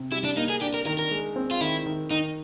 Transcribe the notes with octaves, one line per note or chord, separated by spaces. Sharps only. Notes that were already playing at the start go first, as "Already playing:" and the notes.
Already playing: C3
G3 E4
D4
A#3 D#4
G#4
D4 G4
A#4
D#3 A#4
A#4
G#3
C4
F4
D#3 E4
D#3
D#3 D#4